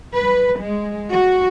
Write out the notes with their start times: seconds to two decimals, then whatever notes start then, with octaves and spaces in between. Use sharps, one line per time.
0.14 B4
0.60 G#3
1.10 F#4